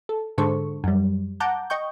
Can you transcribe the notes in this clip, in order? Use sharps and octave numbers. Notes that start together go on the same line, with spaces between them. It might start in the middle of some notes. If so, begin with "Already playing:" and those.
A4
G#2 D3 G#3 A4 C5 C#6
F#2 G3
F#5 A5 A#5 D6 G6
D#5 G5 C#6 G6